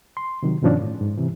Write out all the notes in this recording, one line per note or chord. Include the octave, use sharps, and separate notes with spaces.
C6
C3 D#3 F#3
G2 B2 D#3 F3 C#4 D4
A2
G#2
C3 E3